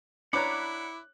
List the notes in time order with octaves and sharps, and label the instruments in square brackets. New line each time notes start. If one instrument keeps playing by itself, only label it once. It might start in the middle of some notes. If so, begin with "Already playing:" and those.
[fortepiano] D4 C#5 A#5 [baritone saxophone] E4 [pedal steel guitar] F#5 B5 [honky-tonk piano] D6 F#6